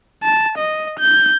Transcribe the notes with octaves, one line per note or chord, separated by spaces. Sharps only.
A5
D#5
G6